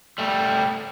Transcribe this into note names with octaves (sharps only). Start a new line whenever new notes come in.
G3 A3